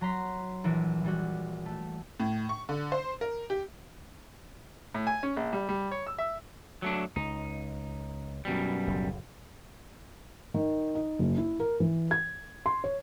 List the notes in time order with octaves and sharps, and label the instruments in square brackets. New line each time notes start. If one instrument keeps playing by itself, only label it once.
[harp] F#3 A#5 C6 B6
A#1 E3
E3 G3 F#4
A3
[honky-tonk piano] A2
C#6
D3
C5
A#4
G4
[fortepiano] A2
G#5
C#4
A#1
G3
G3
C#5
E6
E5
[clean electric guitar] F#3 A3 D4
[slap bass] C#2 [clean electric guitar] D#4
[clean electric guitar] F#2 B2 G3
[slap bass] F#1 D2 A2
[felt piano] D#3
D#4
F#1
E4
A#4
E3
G#6
C6
C#5